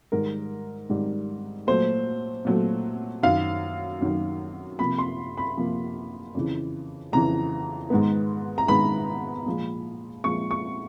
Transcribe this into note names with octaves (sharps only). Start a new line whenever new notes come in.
G#2 D#3 G3 A#4
G#2 D#3 G3
A#2 F#3 A3 C5
A#2 F#3 A3
F#2 D#3 F#3 F5
F#2 D#3 F#3
C3 F3 A#3 B5
C6
B5
C3 F3 A#3
F2 C#3 E3
F2 C#3 E3 A#5
G#2 D#3 G#3 B3
A#5
G#2 D#3 G#3 B3 B5
A#2 F3 G#3
A#2 F3 G#3 C#6
C#6